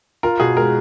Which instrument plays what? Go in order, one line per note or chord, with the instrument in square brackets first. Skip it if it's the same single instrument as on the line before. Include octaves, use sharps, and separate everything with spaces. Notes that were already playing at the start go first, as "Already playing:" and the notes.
[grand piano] F4 [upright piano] A#4
[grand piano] B2 [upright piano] G#4
[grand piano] G#3 [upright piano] A#4